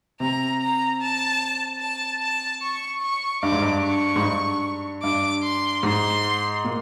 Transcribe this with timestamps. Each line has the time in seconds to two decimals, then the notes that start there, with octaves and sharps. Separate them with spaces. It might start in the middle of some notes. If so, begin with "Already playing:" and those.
0.20 C3 A#5
0.61 A#5
1.01 A5
1.81 A5
2.22 A5
2.62 C#6
3.02 C#6
3.42 G2 D6
3.52 G#2
3.62 G2
3.83 C#6
4.16 G#2
4.22 G2
5.03 G2 D6
5.43 C6
5.83 G#2 C6
6.64 A#2